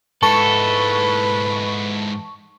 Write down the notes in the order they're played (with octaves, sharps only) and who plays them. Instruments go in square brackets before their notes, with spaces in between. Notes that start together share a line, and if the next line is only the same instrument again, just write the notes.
[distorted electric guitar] G#2 E4 [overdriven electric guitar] A4 [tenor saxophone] B4 [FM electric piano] A5 C#6